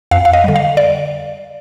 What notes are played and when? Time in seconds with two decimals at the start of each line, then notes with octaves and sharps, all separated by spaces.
0.11 F2 F5
0.25 F5
0.33 D#5
0.44 D3 G3
0.56 F5
0.77 D5